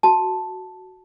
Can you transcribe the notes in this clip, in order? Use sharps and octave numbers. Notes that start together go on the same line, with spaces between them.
F#4 A5